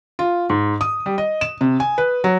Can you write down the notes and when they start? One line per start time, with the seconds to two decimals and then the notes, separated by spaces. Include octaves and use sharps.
0.19 F4
0.50 G#2
0.81 D#6
1.06 G3
1.18 D#5
1.41 E7
1.61 C3
1.80 G#5
1.98 B4
2.24 F#3